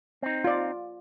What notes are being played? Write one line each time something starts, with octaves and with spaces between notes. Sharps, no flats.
C4 D#4
F4 D5